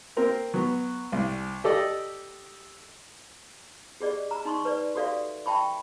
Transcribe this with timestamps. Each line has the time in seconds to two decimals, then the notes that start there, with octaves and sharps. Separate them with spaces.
0.17 A#3 C4 A#4
0.54 F#3 B3
1.12 C2
1.64 G4 A4 D5 D#5
4.00 G4 G#4 D5 D#5
4.31 A#5
4.45 D#4 C6 C#6
4.65 B4 D5
4.95 F#4 G4 A4 D5 E5 F5
5.46 E5 G5 A5 B5 C#6